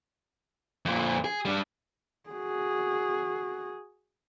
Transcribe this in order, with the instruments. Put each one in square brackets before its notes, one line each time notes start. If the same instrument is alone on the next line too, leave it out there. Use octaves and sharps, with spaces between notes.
[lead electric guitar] F2 A#2
G#4
G3 D4
[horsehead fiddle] F#4 G#4